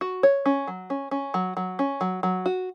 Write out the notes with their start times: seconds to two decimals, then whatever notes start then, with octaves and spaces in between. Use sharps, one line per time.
0.01 F#4
0.23 C#5
0.46 C#4
0.68 F#3
0.90 C#4
1.11 C#4
1.34 F#3
1.57 F#3
1.79 C#4
2.01 F#3
2.23 F#3
2.46 F#4